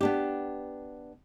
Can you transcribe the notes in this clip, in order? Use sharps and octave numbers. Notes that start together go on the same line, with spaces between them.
B3 D4 G4